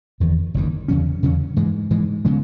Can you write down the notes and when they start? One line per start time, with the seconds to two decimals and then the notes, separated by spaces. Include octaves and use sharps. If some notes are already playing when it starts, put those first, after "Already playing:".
0.20 F#1 E2 D#3
0.54 F#1 E2 D#3
0.88 E2 C#3 F#3 C#4
1.23 E2 C#3 F#3 C#4
1.57 G#2 E3 G#3
1.91 G#2 E3 G#3
2.25 C#3 G#3 B3